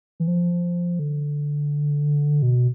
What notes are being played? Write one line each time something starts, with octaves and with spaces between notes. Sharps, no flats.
E3
F3
D3
B2